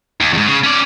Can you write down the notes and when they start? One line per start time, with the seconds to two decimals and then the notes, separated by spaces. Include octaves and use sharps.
0.21 D#2
0.33 E2 G#2
0.48 C#3
0.64 C#4 D5